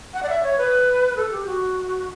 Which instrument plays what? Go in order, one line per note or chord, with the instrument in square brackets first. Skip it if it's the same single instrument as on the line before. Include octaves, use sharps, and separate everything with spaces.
[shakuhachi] F#5
D5
E5
C#5
B4
A4
G4
F#4